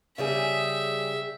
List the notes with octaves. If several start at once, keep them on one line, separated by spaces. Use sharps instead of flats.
C#3 G3 G#4 E5